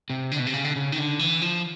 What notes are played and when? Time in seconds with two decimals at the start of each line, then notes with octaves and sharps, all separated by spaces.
0.10 C3
0.31 D3
0.39 B2
0.47 C3
0.53 C#3
0.65 D3
0.76 C#3
0.92 D#3
0.98 D3
1.19 E3
1.42 F3